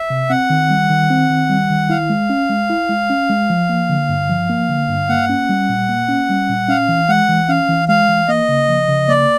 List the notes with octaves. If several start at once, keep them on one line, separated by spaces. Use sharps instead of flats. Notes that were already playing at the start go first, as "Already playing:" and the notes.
Already playing: E5
C3
C4 F#5
D#3
G3
D#3
C4
D#3
G3
D#3
E4 F5
G#3
C#4
G#3
E4
G#3
C#4
G#3
F3
A#3
D3
G2
F3
A#3
D3
G2
A#3 F#5
C#4
G3
A#2
A#3
C#4
G3
A#2
C#4 F5
E3
G#3 F#5
E3
C#4 F5
E3
G#3 F5
E3
A#3 D#5
C#3
F3
C#3
A#3 D5